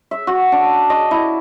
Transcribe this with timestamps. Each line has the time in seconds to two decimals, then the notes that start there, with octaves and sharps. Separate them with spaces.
0.11 E5
0.27 F#4
0.52 D4
0.90 D#5
1.11 E4